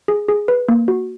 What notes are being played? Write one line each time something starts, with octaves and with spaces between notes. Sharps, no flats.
G#4
G#4
B4
A#3
F#4